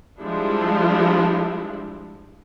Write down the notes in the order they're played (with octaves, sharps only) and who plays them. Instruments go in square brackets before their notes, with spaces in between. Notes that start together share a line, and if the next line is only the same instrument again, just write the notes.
[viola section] F3 G3 G#3 D4 E4